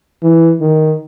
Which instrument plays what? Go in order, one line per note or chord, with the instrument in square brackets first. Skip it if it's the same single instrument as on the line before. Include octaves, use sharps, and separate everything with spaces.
[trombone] E3
D#3